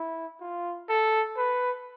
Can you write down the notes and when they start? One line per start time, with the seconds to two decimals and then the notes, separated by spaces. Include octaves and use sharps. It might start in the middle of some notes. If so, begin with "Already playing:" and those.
Already playing: E4
0.40 F4
0.89 A4
1.37 B4